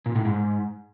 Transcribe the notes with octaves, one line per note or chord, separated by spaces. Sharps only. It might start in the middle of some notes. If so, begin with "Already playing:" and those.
A#2
A2
G#2